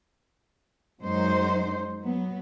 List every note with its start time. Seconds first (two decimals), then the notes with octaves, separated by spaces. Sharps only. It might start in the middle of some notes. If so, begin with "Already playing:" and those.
1.01 F#2 F#3 G#3 D#4 C5
2.01 F#3 B3